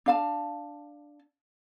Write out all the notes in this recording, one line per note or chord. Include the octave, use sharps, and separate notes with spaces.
D4 F5 A5